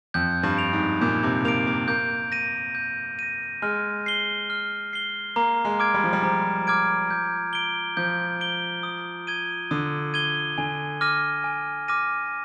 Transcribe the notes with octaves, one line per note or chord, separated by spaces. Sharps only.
F2 G6
G2
D7 F7
G#2
A#2 G6
C3
A#3 D7 F7
A#3
A#3 G6
A#6 D#7
G6
A#6 D#7
G#3 F6
C7 G7
F6
C7 G7
A#3 A#5
G#3
D6 F6 G#6 D7
G3
F3
G3
F3 A#5
D6 F6 G#6 D7
G6
D7 G7
F3 G6
D7 G7
D#6
G#6 D#7 G7
D3 D#6
G#6 D#7 G7
D3 G#5
D6 F6 A#6 D#7
G#5
D6 F6 A#6 D#7